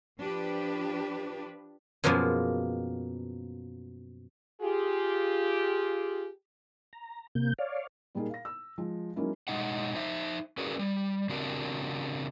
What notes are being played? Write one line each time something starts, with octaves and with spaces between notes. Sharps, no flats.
F3 D4 G4 B4
F#2 B2 F3 G#3 A#3 B3
F4 G4 G#4
A#5
C3 A#3 G6
C#5 D5 F5
A#2 G3 A#3 D#4 G#4 A#4
F5 A#6
E6
F3 G#3
F#3 G#3 A#3 C#4 D#4 E4
B2 G#3 D#4 D#5 F#5
D#4 C5 E5
C#4 F#4 G#4 A#4 B4 D5
G3
C#3 C4 D4 F#4 G4 A#4